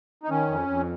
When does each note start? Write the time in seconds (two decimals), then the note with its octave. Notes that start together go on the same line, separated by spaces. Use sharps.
0.23 D#4
0.30 D#3 C#4
0.49 F2
0.68 F2